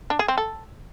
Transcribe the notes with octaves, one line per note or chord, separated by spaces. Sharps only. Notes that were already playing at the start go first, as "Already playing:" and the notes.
D4
G#4
C4
A4